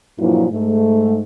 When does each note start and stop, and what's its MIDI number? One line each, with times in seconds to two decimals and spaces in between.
0.19 0.45 43
0.19 0.45 46
0.19 0.45 53
0.19 0.45 54
0.19 0.45 58
0.19 0.45 64
0.51 1.23 44
0.51 1.23 57